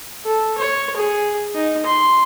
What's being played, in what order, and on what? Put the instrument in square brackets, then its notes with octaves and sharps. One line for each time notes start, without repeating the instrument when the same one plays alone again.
[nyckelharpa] A4
C#5
G#4
D#4
C6